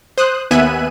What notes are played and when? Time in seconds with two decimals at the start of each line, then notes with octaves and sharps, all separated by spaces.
0.18 C5 D#6 F#6
0.51 D#2 B3 E5 G#5 F#6 D#7